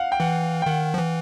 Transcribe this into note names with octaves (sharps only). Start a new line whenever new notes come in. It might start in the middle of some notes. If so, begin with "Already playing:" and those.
Already playing: F5 F#5
G5
E3 F#5
G5
D#3 F#5
F3
E3